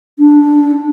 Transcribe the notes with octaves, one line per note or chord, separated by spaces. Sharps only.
D4